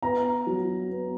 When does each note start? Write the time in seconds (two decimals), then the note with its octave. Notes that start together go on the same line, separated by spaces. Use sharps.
0.03 B3 A#5
0.47 F#3
0.89 B3